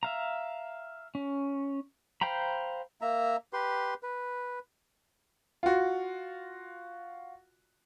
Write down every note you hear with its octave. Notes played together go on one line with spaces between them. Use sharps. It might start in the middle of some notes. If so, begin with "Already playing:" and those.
E5 F5 A#5
C#4
C5 F5 G5 A#5 B5
A#3 E5 A#5
G4 B4 C6
B4
F4 F#4